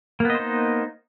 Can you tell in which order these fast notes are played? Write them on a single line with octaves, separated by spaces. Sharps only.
A#3 B3 D#5 C5 D#4